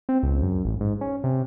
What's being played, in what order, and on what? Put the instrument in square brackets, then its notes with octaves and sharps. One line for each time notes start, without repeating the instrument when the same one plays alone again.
[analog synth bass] C4
C#2
F#2
A1
G#2
C#4
C3